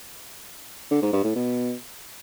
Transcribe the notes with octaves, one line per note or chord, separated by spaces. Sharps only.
D3
G#2
G2
A2
B2